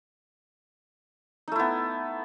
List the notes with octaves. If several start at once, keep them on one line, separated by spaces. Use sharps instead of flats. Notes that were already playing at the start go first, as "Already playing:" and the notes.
A3 B3 D#4 E4